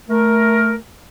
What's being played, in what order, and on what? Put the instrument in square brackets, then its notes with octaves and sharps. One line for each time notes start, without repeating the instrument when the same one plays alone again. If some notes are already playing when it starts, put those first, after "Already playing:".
[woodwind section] A3 A#4